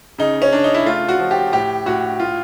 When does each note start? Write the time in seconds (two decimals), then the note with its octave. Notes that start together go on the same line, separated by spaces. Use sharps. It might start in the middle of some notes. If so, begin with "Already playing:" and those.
0.19 C#3 D#4
0.42 C#4
0.52 C#3 D4
0.64 D#4
0.74 E4
0.86 A3 F4
1.09 F#4
1.19 F3
1.31 G4
1.53 A2 G4
1.86 A2 F#4
2.20 A2 F4